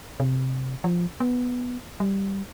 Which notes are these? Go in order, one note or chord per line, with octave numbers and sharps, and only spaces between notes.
C3
F3
B3
G3